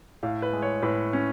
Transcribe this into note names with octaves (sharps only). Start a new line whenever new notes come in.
A2 F5
B4
G#3
C#5
A2 B4
C#4